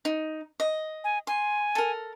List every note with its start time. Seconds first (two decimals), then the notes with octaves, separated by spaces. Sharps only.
0.05 D#4
0.60 D#5
1.04 G#5
1.27 G#5 C6
1.75 A4 A#4